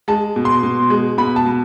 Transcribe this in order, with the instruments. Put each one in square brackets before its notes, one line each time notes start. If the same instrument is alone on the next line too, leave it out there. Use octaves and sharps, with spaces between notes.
[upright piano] G#3 A5
B2
C6
B2
G#3
B2 B5
A5
B2